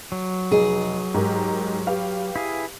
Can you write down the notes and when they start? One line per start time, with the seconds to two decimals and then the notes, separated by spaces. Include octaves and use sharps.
0.12 F#3
0.52 F1 D#4 G#4
1.14 G#2 G4 A#4
1.87 G4 B4 F5
2.36 E4 G#4